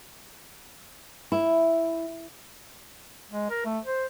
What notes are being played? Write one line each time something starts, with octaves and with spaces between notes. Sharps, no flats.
E4
G#3
A#4
A3
C5